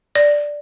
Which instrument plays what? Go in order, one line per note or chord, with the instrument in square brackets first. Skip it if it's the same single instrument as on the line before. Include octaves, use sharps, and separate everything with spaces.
[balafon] D5